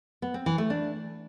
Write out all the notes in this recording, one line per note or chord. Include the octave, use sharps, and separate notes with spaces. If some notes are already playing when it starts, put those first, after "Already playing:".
B3
C4
E3
A3
D4